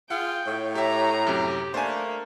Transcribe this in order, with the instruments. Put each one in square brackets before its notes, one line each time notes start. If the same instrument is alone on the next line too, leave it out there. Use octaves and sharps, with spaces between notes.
[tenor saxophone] F4 [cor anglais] G#4 [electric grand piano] F#5 [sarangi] G5
[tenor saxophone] A2 [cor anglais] C#5
[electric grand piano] G4 E5 [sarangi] A#5
[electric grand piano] F#2 C3 [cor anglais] G4
[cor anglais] A3 [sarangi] A#3 [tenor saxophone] D4 [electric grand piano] C5 G#5